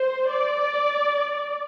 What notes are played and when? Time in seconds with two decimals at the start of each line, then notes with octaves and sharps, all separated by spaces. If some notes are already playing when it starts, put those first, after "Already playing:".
Already playing: C5
0.33 D5